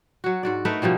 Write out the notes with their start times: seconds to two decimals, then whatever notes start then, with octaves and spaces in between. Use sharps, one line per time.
0.24 F#3 F#4
0.43 G#2 F#4 D5
0.65 A3 D#4 A#4 B4
0.82 B2 F3 G3 A#3